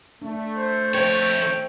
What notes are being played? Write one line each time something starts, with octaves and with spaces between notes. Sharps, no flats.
A3 D4
C5
F2 C5 C#5 G5